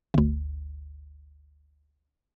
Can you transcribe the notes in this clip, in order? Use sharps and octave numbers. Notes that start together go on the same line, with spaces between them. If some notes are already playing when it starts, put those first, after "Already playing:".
G1 D2